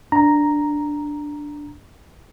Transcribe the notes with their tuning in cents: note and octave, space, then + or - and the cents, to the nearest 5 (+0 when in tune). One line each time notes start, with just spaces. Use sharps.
D4 +0 A#5 +0